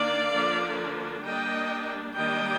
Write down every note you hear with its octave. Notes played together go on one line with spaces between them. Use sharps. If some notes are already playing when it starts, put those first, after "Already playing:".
Already playing: D#3 A#3 D4 D5 F5
D3 F3 A#3 D4
G3 A#3 D4 D#5 G5
D#3 G3 A#3 D4 D#5 G5